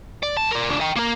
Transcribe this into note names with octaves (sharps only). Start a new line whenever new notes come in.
D5
B1 A5
A#4 D5
C#2 D4
D#5 G5
A#3 A#4